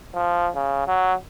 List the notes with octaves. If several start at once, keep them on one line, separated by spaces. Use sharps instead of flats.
F3
C#3
F#3